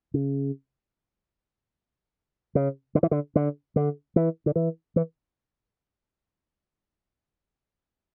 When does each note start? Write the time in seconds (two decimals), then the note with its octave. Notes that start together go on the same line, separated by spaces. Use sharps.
0.14 C#3
2.55 C#3
2.95 D3
3.03 E3
3.11 D3
3.36 D3
3.76 D3
4.16 E3
4.46 D3
4.56 E3
4.96 E3